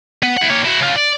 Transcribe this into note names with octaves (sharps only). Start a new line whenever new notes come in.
B3
E4 F#5
A#3 C#5
E4 F#4
C#3 F4
D5